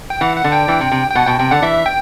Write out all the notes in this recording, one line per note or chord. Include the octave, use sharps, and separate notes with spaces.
G5
E3 F#5
F#5
D3
G5
E3
C3
C3
G5
B2 F#5
B2 G5
C3 G5
D3 F#5
E3 E5
G5